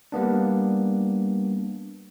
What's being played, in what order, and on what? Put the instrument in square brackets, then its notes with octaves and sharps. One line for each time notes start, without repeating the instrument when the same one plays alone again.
[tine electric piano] G3 A#3 B3 D4